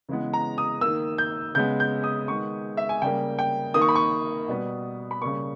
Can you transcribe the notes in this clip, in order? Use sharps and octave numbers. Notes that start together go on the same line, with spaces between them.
C#3 E3 G#3 B3
A#5
D#6
D#3 A#3 E6
G6
C#3 G#3 B3 G6
G6
D#6
D#3 G#3 B3 C#6
E5
G#5
C#3 G3 A#3 G5
G5
D#3 A#3 D#6
C#6
B5
C#6
B2 G3 B3
B5
C#3 G3 A#3 C#6